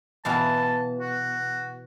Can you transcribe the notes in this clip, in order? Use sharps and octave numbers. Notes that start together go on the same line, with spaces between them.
B2 E3 F5 A5
F#4